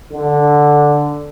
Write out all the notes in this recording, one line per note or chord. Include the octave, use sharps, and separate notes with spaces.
D3